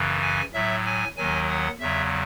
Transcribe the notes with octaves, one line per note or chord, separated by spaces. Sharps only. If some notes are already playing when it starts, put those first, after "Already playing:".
Already playing: F#2 C#3 E3
G#5
A2 F#3 E5
G#5
D#2 D#3 F#3 G#5
F#5
E2 C#3 F#3 E5